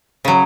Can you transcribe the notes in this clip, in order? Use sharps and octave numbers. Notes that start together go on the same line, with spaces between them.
C#3 F#3